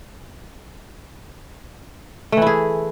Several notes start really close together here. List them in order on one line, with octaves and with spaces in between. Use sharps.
A3 E3 E4 G#4